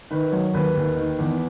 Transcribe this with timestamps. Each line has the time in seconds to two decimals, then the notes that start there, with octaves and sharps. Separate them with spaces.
0.11 D#3 B4
0.32 F#3 C#5
0.53 D#2 B4
0.76 D#2
0.96 D#3
1.19 E2